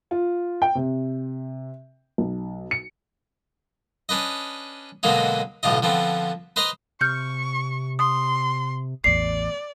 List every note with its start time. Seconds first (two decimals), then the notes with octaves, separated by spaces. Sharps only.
0.11 F4
0.62 G5
0.75 C3
2.18 B1
2.71 C#7
4.09 C#4 D4 B4 D#5
5.03 B2 D3 F#3 G#3 A#3 D#4
5.63 B1 A2 D3 F4 D#5
5.82 D3 F3 B3 C4
6.56 B4 C5 D#5 A#5 C6
7.01 C3 C#6 F6 G6 C#7
7.99 C6 D#6
9.04 A1 E2 D5 C7